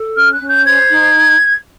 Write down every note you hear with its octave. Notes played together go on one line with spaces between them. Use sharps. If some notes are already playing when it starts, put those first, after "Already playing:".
Already playing: A4
C#4 F6
F#6
C#4
G6
C5 G#6
D#4